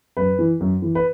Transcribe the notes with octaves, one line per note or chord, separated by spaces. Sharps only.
F#2 B4
E3
F#2
E3
B4